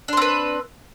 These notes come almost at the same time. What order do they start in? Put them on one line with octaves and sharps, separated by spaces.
D4 C5 C4 B4